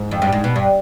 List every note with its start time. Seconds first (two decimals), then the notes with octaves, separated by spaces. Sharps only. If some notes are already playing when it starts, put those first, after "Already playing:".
Already playing: G#2
0.11 F2
0.22 G2
0.32 G#2
0.44 B2
0.56 G2